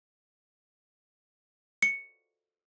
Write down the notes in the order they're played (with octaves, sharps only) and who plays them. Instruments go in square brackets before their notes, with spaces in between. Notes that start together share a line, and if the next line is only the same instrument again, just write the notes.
[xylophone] C#7